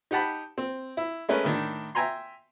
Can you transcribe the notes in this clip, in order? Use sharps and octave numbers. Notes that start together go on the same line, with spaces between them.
D#4 G4 F#5 A5 B5
C4
E4
G#3 A3 C#4 A#4 B4
A2 D#3 D4
E5 G5 G#5 A#5 C6